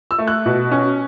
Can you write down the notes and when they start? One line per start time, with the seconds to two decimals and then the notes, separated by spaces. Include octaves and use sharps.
0.11 E6
0.18 A3
0.28 F#6
0.46 B2
0.71 C#4